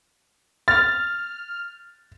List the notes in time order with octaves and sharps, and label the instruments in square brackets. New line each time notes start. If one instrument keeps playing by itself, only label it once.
[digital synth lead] F6 [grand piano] A6